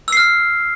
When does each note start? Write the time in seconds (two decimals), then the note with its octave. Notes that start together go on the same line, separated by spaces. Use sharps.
0.08 E6
0.12 C7
0.17 F6